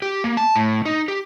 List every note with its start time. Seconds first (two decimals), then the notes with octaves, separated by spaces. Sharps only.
0.02 G4
0.24 A#3
0.37 A5
0.56 A2
0.85 D#4
1.08 G4